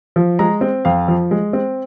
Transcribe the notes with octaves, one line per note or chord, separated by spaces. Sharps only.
F3
G#3 A#5
C4
F2 F5
F3
G#3
C4